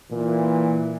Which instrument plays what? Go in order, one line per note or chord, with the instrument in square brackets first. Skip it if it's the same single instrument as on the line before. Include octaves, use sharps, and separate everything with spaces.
[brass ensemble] A#2 E3